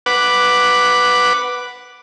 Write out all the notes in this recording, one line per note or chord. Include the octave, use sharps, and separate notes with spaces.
B4 F#5 D6